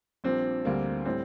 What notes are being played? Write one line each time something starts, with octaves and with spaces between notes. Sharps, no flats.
A#1 A#2 G3 C4 D4
D2 D3 G3 A#3
A2 G3 C4